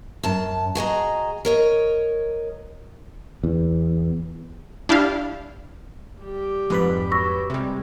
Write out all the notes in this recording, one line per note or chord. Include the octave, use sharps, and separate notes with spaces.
F#2 A5
F#4 G#4 D#5 A#5
A#4 C#5 D#5
E2
D4 E4 G4 F5
G3 G4
F2 G#2 B4 B5
F#3 G4 C#6 E6 A#6
C3 G3 G#3